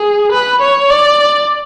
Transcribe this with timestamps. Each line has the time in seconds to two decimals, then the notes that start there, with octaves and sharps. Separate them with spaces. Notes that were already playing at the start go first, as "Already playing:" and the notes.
Already playing: G#4
0.32 B4
0.61 C#5
0.91 D5